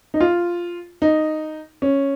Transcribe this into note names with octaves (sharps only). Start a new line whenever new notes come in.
D#4
F4
D#4
C#4